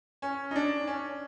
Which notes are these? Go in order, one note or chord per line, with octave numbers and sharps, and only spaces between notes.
C#4
D#4
D4
C#4